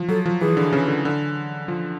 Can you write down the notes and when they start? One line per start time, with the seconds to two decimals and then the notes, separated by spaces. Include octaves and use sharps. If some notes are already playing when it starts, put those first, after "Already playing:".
Already playing: F3
0.09 F#3 A4
0.26 F3
0.41 E3 G#4
0.57 D3
0.73 C#3
0.88 D3
1.05 D3
1.68 F3